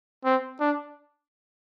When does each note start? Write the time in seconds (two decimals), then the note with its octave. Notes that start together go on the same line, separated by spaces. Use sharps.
0.25 C4
0.60 D4